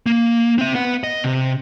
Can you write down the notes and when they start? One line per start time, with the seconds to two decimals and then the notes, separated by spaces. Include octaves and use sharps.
0.06 A#3
0.58 C4 E5
0.75 B3 F#5
1.04 D#5
1.24 C3